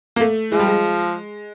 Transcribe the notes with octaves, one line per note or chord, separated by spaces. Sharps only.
A#3
A3
F3 G#3
G3
G#3